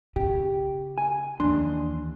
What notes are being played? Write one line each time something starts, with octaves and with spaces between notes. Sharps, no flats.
C#3 G4
G#5
D#2 E3 D4 C6